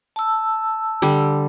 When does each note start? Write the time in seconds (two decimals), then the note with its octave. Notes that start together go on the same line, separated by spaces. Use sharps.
0.16 A5 E6
1.02 D3 G3